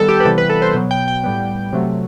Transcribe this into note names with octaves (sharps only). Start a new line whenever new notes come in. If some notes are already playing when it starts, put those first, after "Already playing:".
Already playing: D#3 G3 B3 A4
G4
B4
C3 E3 G3 B3 A4
B4
A4
C5
B2 F#3 B3
G5
G5
A2 G3 B3
C3 F#3 A3